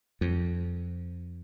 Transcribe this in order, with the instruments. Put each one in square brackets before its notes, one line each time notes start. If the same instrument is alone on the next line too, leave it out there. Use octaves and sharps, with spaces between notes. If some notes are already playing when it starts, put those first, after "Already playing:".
[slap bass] F2